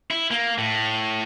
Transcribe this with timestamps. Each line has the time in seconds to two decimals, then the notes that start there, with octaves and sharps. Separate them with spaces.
0.11 E4
0.31 A#3
0.58 A2